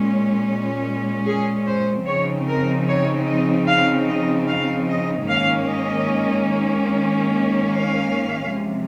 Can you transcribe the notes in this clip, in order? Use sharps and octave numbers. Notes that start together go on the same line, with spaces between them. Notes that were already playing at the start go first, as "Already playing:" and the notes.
Already playing: A#2 G#3 C#4
G#4
C5
C#3 F3 C4 D#4 C#5
A#4
C#5
D#5
F5
D#5
F5
D#5
G#2 D#3 A#3 C#4 F5
D#5
F5
C3 F3 G#3